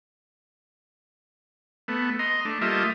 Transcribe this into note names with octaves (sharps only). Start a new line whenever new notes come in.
A3 B3
D#5 A#5 C6
A3 D4
G3 A3 A#3 F4 D#5 E5